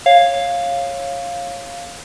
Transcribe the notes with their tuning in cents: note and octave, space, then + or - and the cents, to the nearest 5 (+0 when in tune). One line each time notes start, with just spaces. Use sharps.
C#5 -10 F5 +0